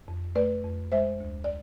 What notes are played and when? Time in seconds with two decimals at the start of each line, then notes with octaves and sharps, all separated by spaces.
0.08 F2
0.35 A3 B4 D5
0.64 F2
0.92 G#3 C5 E5
1.20 D2
1.44 D5